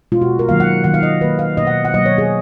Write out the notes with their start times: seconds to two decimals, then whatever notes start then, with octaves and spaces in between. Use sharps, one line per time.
0.12 B2 G#3 F4
0.21 F#4
0.39 A#4
0.48 D#3 F#3 A#3 F5
0.60 F#5
0.84 D#3 F#3 A#3 F#5
0.94 F5
1.03 D#5
1.21 D#3 A#3 B4
1.39 F5
1.57 B2 A#3 D#5
1.67 F#5
1.85 F#5
1.94 B2 F#3 A#3 D#5
2.06 C#5
2.18 G#4